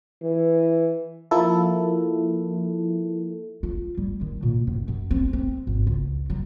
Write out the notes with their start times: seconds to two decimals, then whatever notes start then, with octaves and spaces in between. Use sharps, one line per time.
0.23 E3
1.31 F3 A#3 E4 A4
3.63 F4
3.97 G3
4.21 D#3
4.43 A#2
4.67 F#2
4.88 F#2
5.11 C4
5.33 C4
5.67 G#1
5.87 C#2
6.30 F#3